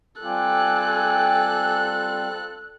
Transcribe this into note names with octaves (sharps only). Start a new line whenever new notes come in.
G3 C4 F4 A4 G5 G#5 D6 F#6